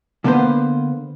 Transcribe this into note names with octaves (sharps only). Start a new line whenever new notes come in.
D3 A#3 B3 B4 C5